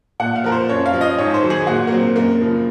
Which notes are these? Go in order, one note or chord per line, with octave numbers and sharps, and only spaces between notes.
A#2 F#5
F5
F3 A#4
C5
F#2 C#5
F5
F3
D#5
G#2 C#5
C5
D#3 F#3
G#4
A#2 F#4
A#3
F#3 C4
F#2 A#3
C#3 F3